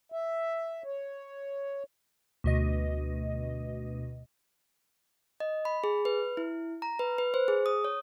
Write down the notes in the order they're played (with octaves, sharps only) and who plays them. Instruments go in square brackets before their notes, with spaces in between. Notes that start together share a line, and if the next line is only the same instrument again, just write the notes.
[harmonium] E5
C#5
[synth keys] D2 B2 D#5
[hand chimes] D#5
B5
G#4
B4
E4
A#5
B4
B4
C5
G#4
D#6
C#5